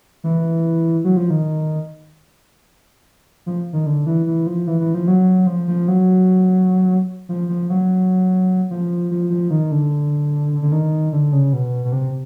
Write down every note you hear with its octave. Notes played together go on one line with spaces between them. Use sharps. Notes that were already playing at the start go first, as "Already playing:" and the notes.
E3
F#3
F3
D#3
F3
D#3
D3
E3
E3
F3
E3
E3
F3
F#3
F3
F3
F#3
F3
F3
F#3
F3
F3
F3
D#3
D3
D3
D#3
D3
C#3
B2
B2
C3